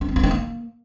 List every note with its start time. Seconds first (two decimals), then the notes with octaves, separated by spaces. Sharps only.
0.01 D4
0.09 C4
0.16 F4
0.23 D#4
0.31 A#3